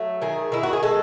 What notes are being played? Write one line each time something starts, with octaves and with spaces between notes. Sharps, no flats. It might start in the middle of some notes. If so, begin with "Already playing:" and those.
Already playing: F#3 A3
D#3 G#4
D#3 E4
F#4
G#4
G#3 A4